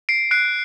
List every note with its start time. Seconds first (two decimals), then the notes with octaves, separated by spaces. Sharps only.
0.09 C7 D7
0.31 F#6 C7 D7